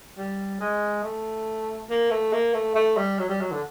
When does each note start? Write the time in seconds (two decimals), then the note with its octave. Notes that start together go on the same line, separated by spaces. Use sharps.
0.17 G3
0.60 G#3
1.03 A3
1.90 A#3
2.11 A3
2.33 A#3
2.54 A3
2.75 A3
2.97 G3
3.19 F#3
3.29 G3
3.41 F#3
3.51 D3